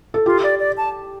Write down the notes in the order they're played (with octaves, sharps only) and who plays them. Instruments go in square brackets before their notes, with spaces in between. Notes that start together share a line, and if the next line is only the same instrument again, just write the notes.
[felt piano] A4
[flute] F4 [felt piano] G4
[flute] D5
D5
A5